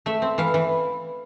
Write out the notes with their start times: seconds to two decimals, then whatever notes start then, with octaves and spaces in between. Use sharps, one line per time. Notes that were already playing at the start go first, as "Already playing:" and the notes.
0.06 A3 E5
0.22 C4
0.38 E3 F5
0.54 E3